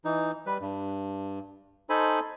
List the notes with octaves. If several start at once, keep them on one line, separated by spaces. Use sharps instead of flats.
E3 D#4
G3 B4
G2
D#4 A4 C5 G#5 B5